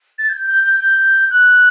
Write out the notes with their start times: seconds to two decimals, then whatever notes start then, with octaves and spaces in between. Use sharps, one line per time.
0.18 A6
0.29 G6
0.47 G6
0.64 G6
0.80 G6
1.31 F#6